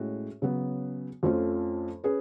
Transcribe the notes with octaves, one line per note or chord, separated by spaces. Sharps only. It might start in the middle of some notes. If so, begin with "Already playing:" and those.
Already playing: A2 G#3 C#4 F#4
C#3 F#3 B3
F2 F3 A3 C#4 F4
C#4 G#4 B4